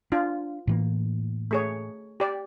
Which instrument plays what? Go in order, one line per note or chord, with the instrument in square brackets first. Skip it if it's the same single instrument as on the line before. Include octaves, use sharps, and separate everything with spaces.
[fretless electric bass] D4 [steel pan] F4
[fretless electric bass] A2 E3 A#3
[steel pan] A3 G#4 C#5
G4 D5